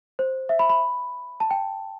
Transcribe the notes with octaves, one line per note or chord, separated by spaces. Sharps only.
C5
E5
B5
B5
A5
G5